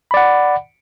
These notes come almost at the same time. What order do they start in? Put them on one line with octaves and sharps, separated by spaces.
B5 D5 F#5